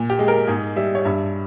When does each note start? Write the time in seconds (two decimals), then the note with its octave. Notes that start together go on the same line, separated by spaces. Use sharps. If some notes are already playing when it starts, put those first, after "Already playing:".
Already playing: A#2
0.10 G4
0.19 G#3
0.28 A#4
0.47 G#2 G#4
0.76 G3 E5
0.95 C#5
1.05 G2 E5